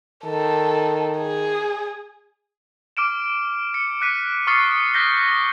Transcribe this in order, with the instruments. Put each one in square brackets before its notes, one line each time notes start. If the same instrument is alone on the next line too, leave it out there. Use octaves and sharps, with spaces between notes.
[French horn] D#3 [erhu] A4
[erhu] G#4
[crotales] D6 F6 D7 E7
C#7
D6 F#6 B6 D#7
C#6 D#6 F6 A6 C7 C#7
F#6 G6 A#6 B6 G7